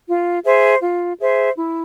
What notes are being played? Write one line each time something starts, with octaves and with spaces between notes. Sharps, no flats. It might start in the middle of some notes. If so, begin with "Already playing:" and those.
F4
G#4 C5 E5
F4
G#4 C5 E5
E4